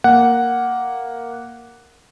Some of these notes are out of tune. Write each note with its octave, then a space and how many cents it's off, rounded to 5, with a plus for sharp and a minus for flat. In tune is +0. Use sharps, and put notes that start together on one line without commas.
A#3 +0 F#5 +0